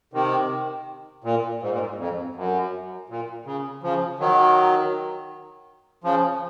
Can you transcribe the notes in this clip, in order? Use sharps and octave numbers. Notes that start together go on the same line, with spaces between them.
C3 D#3
A#2
G#2
A#2
G#2
F2
F#2
A#2
C#3
C#3 F3
D#3 F#3
C#3 F3